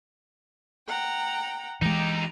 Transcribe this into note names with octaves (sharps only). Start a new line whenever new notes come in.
F#5 G5 A#5
E3 G#3 D#4 G4 A#5